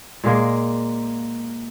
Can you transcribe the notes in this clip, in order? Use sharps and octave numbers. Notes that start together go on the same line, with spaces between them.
A#2 G#3 A#3